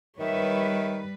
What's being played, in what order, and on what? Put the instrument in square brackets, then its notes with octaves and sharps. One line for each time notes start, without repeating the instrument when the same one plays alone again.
[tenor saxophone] D#3 [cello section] G3 B4 [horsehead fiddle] C#5 E5